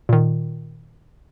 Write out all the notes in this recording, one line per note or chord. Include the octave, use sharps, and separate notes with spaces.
A#2 D#3